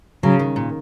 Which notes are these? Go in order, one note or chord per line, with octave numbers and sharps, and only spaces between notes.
C#3 F#3
D#3
A#2